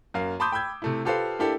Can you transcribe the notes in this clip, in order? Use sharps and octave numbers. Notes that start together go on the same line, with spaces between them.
F#2 A#3 F5
A5 B5 C6 D6 D#6 G6
G5 B5 E6 G6 G#6
C3 A3 E4
F4 G4 A4 B4 C5 F5
A#3 D4 E4 G4 A4